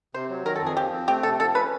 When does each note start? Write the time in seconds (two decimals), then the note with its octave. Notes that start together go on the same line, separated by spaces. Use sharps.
0.14 C3 C5
0.30 F#3
0.45 D#3 A#4
0.55 A4
0.62 F2 G#4
0.77 F3 G4
0.93 C4
1.08 A3 G4
1.23 C3 A4
1.39 F3 A4
1.55 C#4 B4